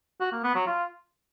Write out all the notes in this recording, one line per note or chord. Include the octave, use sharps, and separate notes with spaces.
F#4
A#3
B3
F#3
F4